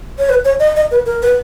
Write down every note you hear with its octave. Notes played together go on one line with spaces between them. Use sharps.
C#5
B4
C#5
D#5
D#5
B4
A#4
B4